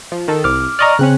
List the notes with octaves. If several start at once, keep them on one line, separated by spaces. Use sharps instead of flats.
F3
D#3 A4
C2 D6 F6
D5 D#5 A#5 C#6 D#6 F6
C#3 C4 C#4 F#6